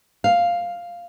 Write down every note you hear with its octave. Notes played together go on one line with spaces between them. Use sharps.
F5